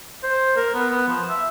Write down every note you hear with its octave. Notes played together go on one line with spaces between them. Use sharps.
C5
A#4
B3
B3
F3
E5